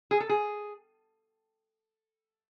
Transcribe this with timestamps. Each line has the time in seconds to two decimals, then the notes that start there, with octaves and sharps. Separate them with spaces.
0.11 G#4
0.20 A4
0.29 G#4